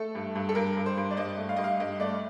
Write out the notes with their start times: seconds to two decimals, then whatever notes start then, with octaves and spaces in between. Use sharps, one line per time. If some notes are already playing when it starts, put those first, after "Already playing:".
Already playing: A3 A4
0.15 G2
0.35 G2
0.49 A4
0.55 G2 A#4
0.77 G2
0.86 C5
0.97 G2
1.11 D5
1.17 G2 D#5
1.38 A3
1.49 F5
1.56 G2 D#5
1.64 F5
1.80 G2 D#5
2.00 A3 D5